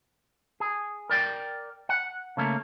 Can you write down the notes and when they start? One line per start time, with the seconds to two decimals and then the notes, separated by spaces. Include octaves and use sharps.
0.60 G#4
1.09 A#4 D5 G5
1.89 F#5
2.37 C#3 A3 A#3